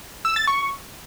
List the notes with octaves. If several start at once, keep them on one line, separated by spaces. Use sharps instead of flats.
E6
A6
C#6